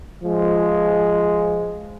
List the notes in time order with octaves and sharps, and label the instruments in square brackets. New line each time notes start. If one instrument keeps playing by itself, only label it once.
[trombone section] F3 G#3